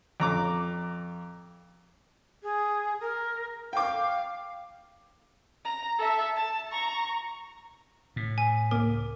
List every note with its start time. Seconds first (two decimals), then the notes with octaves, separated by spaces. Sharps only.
0.20 F2 A#5 D6
2.43 G#4
3.01 A#4
3.73 F5 G5 D6
5.65 A#5
5.99 A4 E5
6.36 A5
6.71 A#5 C#6
8.16 A2
8.38 G#5
8.71 C#2 A#3 A#4 D6